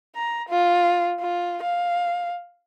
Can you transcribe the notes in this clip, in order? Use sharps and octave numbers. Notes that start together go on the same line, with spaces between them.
A#5
F4
F4
F5